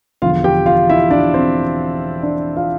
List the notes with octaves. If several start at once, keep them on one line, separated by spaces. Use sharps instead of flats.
E1 E2 D3 F3 F4 F5
G4 G5
F4 F5
E4 E5
D4 D5
C4 C5
D4 D5
F4 F5